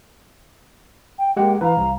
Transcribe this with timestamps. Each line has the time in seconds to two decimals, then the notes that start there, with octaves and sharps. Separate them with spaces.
1.18 G5
1.37 G#3 A#3 G4 F#5 G5
1.61 E3 B4 F5 A#5
1.77 C2